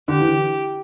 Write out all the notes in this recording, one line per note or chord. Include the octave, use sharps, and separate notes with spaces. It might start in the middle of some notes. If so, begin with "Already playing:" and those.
D3 G4
E3